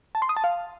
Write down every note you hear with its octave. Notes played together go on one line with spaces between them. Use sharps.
A5
C6
D#6
A5
F5